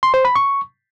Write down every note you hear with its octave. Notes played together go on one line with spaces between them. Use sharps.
C6
C5
B5
C#6